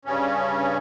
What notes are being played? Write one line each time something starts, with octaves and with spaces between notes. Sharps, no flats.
G2 C#3 C#4